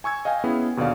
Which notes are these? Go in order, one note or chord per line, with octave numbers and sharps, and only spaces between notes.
G#5 C#6 E6 G#6
D#5 F5 G5 G#5
B3 C#4 E4 G#4
D#2 B2 D3 D5 F5